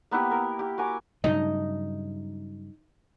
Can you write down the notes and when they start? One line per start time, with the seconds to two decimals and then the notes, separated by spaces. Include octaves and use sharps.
0.11 A#3 B3 E4 G4
0.31 A#4
0.59 G4
0.78 F#4 A#4 G#5 D6
1.24 G2 C#3 F#3 D#4